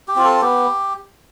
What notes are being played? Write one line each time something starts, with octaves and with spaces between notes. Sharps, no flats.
G4
C4 F4
A4
B3 G4